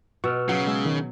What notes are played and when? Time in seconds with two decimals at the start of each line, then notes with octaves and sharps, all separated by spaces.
0.24 B2 C#6 E6 F6
0.49 C#3 F#3
0.67 G#3 G#5 E6
0.85 D#3